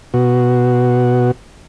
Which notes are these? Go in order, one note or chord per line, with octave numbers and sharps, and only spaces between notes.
B2 F#4